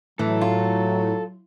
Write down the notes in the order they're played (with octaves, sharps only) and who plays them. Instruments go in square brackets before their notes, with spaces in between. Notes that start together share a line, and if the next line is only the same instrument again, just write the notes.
[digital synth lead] A2 [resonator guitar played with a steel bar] E3 [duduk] F#3 [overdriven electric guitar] A4
[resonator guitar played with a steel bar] F4